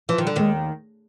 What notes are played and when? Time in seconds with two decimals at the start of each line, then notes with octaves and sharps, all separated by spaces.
0.09 E3 F3
0.18 D#3
0.24 D3 G3
0.36 D#2 D#3 G#3